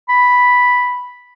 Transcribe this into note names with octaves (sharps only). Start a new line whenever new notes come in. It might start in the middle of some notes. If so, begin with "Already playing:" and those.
B5